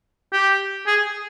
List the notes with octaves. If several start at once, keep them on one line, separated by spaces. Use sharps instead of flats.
G4
G#4